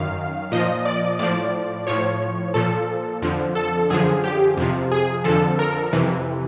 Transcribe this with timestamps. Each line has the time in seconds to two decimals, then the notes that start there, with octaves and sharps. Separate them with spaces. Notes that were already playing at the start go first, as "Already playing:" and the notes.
Already playing: F#2 D#3 F5
0.52 A#2 F3 D#5
0.85 D5
1.19 A2 F3 D5
1.87 A2 F3 C#5
2.54 A#2 F3 A4
3.22 F2 D3 F3
3.55 A4
3.90 F#2 D3 F3 G#4
4.24 G4
4.57 F2 C3 F3
4.92 G#4
5.24 F2 D3 F3 A4
5.59 A#4
5.93 F2 C3 E3